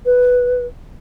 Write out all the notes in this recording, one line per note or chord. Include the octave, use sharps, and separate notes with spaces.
B4